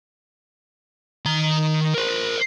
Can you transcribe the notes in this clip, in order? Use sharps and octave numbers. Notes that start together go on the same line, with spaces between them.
D#3 A#5
A#4 C5